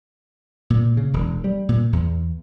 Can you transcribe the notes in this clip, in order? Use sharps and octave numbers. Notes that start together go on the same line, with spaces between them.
A#2
C#3
E1
G3
A#2
E2